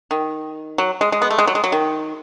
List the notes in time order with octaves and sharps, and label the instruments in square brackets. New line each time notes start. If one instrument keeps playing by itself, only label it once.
[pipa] D#3
F#3
G#3
G#3
B3
A3
G#3
F#3
G#3
F#3
D#3